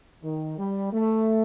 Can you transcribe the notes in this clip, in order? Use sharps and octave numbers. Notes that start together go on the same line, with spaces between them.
D#3
G3
A3